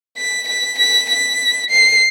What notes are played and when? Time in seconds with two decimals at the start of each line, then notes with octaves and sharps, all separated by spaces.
0.17 B6
0.48 B6
0.79 B6
1.10 B6
1.70 C7